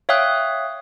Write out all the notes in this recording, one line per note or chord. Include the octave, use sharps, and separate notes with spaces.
C#5 E5 F5 G5 D#6 F#6